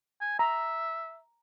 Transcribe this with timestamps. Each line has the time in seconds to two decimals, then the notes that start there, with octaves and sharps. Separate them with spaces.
0.21 G#5
0.39 E5 A#5